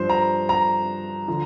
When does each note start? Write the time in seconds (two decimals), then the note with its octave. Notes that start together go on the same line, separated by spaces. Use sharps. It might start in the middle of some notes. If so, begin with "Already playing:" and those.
Already playing: G2 F3 C5
0.10 A#5
0.49 A#5
1.28 D3 F3